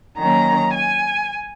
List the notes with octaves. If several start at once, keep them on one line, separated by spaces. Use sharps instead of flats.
D#3 F#3 A#3 C#4 A#5
G#5